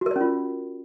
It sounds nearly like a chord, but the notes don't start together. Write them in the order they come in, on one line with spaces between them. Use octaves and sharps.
F#4 A#4 D5 C#4 F4